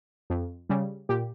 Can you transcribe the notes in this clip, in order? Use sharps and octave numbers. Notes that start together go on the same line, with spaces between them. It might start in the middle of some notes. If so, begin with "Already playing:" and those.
F2
C#3 G3
A#2 G4